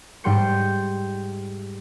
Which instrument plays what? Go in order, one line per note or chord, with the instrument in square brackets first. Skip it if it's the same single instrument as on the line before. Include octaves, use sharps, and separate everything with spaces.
[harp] G#2 G3 G5 C6 G6 C#7